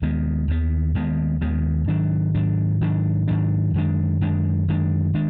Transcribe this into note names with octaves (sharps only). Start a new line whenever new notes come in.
D#2 D#3 G#3 B3
D#2 D#3 G#3 B3
D#2 D#3 G#3 B3
D#2 D#3 G#3 B3
G#2 D#3 F#3 D4
G#2 D#3 F#3 D4
G#2 D#3 F#3 D4
G#2 D#3 F#3 D4
F#2 D#3 G#3 D4
F#2 D#3 G#3 D4
F#2 D#3 G#3 D4
D#3 G#3 D4